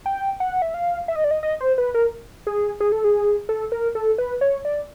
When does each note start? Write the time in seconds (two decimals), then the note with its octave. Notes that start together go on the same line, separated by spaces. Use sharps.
0.06 G5
0.40 F#5
0.62 E5
0.74 F5
1.08 E5
1.16 D#5
1.24 D5
1.31 D#5
1.43 D#5
1.61 C5
1.78 B4
1.94 A#4
2.47 G#4
2.80 G#4
2.92 A4
3.04 G#4
3.49 A4
3.72 A#4
3.95 A4
4.18 B4
4.41 C#5
4.65 D5